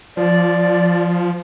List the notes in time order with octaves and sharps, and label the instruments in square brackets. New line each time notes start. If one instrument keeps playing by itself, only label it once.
[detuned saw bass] F3 [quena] D5